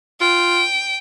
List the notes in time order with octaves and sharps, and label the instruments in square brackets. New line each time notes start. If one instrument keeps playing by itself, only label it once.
[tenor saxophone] F4 [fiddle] G5